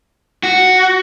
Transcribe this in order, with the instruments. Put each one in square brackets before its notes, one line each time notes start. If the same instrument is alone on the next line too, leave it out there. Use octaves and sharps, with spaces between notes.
[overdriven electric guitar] F#4